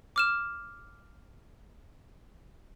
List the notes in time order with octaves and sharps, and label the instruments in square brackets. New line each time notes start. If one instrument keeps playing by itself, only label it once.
[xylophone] D6 F6 E7